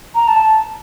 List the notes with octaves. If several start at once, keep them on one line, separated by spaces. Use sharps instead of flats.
A#5
A5